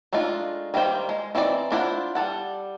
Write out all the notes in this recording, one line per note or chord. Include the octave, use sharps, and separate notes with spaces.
G#3 A3 D4 D#4 F4
D#3 G3 A#3 C5 G5
G#3
E3 C4 D#4 F#4 D5
D4 E4 F4 C5 F#5
G3 A4 F#5